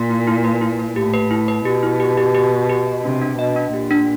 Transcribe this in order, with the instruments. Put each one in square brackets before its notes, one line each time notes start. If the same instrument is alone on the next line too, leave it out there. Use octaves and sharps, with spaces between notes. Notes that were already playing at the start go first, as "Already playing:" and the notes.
Already playing: [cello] A#2
[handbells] E4
E4
B4
E4
B4
[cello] A2 [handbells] G4
[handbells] B4
E4
B4
[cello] B2 [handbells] G4
[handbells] E4
G4
G4
G4
G4
G4
D#5
[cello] C3 [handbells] D4
[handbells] D4
[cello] B2 [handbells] D#5
[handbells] D4
[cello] A#2 [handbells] G4
[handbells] D4